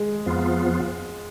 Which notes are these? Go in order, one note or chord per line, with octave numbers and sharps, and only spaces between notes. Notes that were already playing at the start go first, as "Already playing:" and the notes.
Already playing: G#3
F2 F3 B3 F4